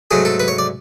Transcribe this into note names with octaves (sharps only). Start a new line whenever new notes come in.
G#2 F#3 A3 G#4
A4
B4
C#5
D5